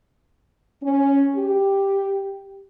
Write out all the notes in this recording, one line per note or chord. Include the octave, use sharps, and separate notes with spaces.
C#4
G4